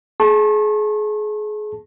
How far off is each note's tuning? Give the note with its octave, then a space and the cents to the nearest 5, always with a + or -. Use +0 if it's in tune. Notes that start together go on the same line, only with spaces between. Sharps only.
G#4 +30 A5 +0 C#6 -40